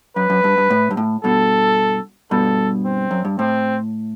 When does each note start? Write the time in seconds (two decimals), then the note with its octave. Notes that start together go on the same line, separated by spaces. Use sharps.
0.16 F#2 B4
0.30 F#2
0.44 G2
0.58 G2
0.70 A2
0.91 G2
0.97 A2
1.24 G2 B2 A4
2.31 G2 B2 A4
2.85 C4
3.11 F#2
3.25 G2
3.39 A2 C4